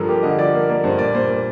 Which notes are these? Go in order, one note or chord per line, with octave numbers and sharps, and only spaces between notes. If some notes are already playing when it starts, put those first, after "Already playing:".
Already playing: G2 F3 A4 A#4
A#3 G4
D3 D#5
F3 D5
A#3
A#3 D5
G2 C5
A#2 D5
A#2 C5
A#2